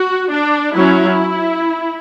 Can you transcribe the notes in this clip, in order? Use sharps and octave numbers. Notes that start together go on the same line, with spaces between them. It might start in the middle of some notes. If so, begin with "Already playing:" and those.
Already playing: F#4
D4
F#3 C#4 E4